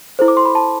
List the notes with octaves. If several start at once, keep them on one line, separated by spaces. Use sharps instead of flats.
E4 A4 C5
D6
C6
B5
A5